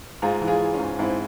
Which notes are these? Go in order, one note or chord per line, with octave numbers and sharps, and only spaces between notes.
G#2 F4 G#4
E3
F4 G#4
E3
C#4 F4
G#2
G#2 C4 E4